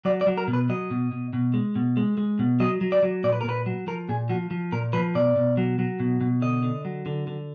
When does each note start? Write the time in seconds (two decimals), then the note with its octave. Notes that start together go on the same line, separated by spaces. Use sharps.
0.05 F#3 D5
0.21 D5
0.27 F#3
0.38 A#4
0.48 B2
0.53 B4
0.69 F#3 D#5
0.91 B2
1.11 B2
1.33 B2
1.54 G#3
1.75 B2
1.97 G#3
2.18 G#3
2.39 B2
2.60 F#3 D#5
2.81 F#3
2.92 D5
3.03 F#3
3.24 A#2 D5
3.32 B4
3.41 A#4
3.44 A#2 B4
3.66 F#3
3.87 F3 A#4
4.09 A#2 G#4
4.29 F3 F#4
4.51 F3
4.72 A#2 A#4
4.93 F3 B4
5.15 B2 D5
5.36 B2
5.57 F#3
5.79 F#3
6.00 B2
6.21 B2
6.42 D3 D#5
6.63 D3
6.85 F#3
7.06 D3
7.27 D3